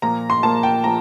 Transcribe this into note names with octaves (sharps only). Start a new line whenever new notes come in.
A#2 F3 A#3 A#5
C6
A#2 F3 A#3 A5
G5
F3 A#3 A#5